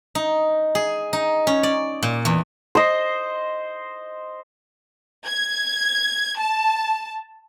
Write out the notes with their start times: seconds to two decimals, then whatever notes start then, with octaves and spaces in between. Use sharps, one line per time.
0.15 D#4
0.75 G#4
1.13 D#4
1.47 C#4
1.63 D5
2.03 A#2
2.25 E2
2.75 C5 D#5
5.26 G#6
6.38 A5